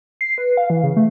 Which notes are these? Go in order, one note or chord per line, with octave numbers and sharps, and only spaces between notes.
C7
B4
F5
E3
C#3
A3